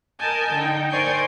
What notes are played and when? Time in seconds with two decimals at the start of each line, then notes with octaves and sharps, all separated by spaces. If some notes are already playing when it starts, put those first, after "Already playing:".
0.19 A#4 D#5 G#5 A5 G6
0.54 D3 D#4 G5
0.90 A#4 C5 D5 G#5 C#6 G6